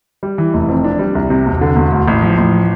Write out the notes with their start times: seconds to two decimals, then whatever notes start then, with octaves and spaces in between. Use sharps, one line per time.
0.23 G3
0.38 E3
0.54 F1
0.68 F2
0.84 D4
0.99 G3
1.15 C2
1.30 C3
1.46 E1
1.61 D3
1.76 E1
1.92 D2
2.08 A1
2.22 F3
2.38 A1